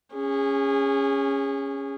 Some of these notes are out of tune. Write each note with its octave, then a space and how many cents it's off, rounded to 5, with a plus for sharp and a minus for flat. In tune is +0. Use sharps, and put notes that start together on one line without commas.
C#4 +0 G#4 -25